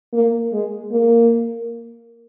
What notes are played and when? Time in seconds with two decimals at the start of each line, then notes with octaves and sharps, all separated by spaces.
0.14 A#3
0.53 G#3
0.92 A#3